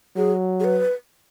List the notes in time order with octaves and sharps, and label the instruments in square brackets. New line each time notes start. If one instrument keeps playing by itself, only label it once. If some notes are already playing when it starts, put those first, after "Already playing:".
[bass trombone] F#3 [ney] G#4
[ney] G#4
B4